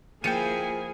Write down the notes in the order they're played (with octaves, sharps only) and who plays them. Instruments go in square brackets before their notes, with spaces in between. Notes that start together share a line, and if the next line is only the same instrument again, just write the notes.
[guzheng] F3 [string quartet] A#3 E4 [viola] G#4 G#5 [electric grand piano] G5 C#7 D#7